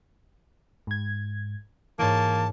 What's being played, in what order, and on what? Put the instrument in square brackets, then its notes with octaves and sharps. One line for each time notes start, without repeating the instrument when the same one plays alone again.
[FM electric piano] G#2 G#6
[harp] G#2 C#5 D7 [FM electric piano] E3 [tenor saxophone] A#3 [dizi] A5